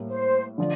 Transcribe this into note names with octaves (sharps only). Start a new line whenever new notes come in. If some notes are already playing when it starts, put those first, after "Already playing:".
Already playing: A2 G3 A#3
C5
D3 F3 D5